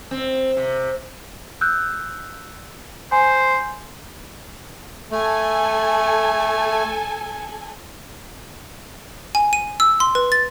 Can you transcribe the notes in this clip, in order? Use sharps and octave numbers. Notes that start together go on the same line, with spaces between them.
C4
C3
E6 F#6 G6
C5 G#5
A3 A4 G#5
G#5
D#7
E6
C6
B4
A6